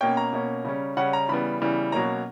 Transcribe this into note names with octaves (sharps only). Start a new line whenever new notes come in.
B2 A#3 C#4 G5
A#5
B2 A#3 C#4
C#3 G3 C#4
C#3 G3 C#4 F#5
A#5
C#3 E3 G3 B3 B5
C#3 E3 G3 B3
B2 F#3 A#3 C#4 A#5